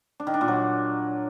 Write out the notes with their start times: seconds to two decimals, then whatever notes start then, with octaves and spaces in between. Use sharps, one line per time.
0.20 D4
0.27 D#3
0.34 D4
0.41 A#2
0.48 F#3